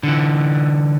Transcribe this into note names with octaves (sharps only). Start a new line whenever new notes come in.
D3 E3